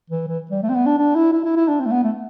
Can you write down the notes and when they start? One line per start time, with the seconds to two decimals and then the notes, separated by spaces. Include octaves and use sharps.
0.10 E3
0.28 E3
0.51 G3
0.63 A3
0.70 C4
0.75 B3
0.86 D4
0.98 D4
1.15 E4
1.33 E4
1.45 E4
1.56 E4
1.68 D4
1.80 C4
1.86 A3
1.92 B3
2.03 A3